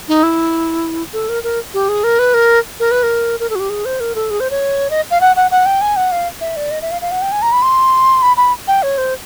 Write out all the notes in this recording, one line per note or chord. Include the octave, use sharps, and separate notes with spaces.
D#4
E4
A4
A#4
A#4
G4
G#4
A#4
B4
A#4
A#4
B4
A#4
A#4
A4
F#4
G4
G#4
C5
A#4
A4
G#4
C5
C#5
D#5
F5
F#5
F#5
F#5
G5
G#5
F#5
F5
E5
D5
D#5
E5
F5
F5
F#5
G5
G#5
A#5
B5
C6
B5
B5
G5
C#5
C5